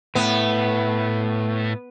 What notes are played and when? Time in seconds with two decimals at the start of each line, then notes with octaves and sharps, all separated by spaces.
0.15 A2 A3 B3